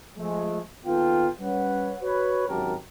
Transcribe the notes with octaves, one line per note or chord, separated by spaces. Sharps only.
F3 G#3 A3
D#2 B3 F4 A4 G5
G3 C#4 B4 C#5 F#5
F#4 B4 C#5
G#1 F#2 F#4 G4 A#4 A5